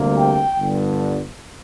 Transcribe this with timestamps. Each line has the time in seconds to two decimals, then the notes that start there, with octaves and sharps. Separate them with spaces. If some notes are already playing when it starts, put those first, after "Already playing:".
Already playing: D2 C3 G3 A#3
0.18 G5
0.57 G1 G2 D3